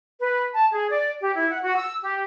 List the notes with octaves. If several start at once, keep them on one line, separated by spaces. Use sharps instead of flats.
B4
A5
G#4
D5
G4
E4
F#5
F#4
E6
G4